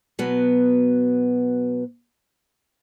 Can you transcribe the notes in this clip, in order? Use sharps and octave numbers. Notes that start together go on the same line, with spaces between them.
B2 F#3 B3